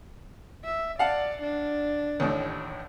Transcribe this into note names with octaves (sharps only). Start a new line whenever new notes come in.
E5
D5 F5 F#5 A5
D4
A1 D#2 A2